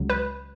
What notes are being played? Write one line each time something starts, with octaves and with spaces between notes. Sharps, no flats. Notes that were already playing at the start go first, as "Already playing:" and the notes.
Already playing: C#2 C#3 F#3
B4